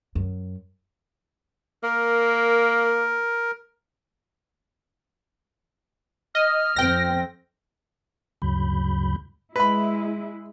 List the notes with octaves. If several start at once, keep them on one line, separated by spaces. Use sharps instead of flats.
F#2
A#3 A#4
D#5 F6
F2 C4 G5 A#6
D2 G2 C#3 F#3 B5 G6
G#3 E4 B4 B5